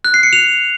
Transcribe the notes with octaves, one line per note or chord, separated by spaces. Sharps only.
F#6
C7
C#7
F7